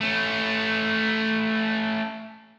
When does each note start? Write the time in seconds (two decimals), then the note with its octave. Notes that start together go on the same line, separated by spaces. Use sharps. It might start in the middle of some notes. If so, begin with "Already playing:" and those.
0.01 A3 C#4